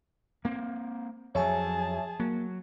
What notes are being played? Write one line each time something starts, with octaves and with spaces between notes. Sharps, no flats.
A#3 C4
F2 F#3 G#4 C#5 E5 G#5 A5
F#3 A#3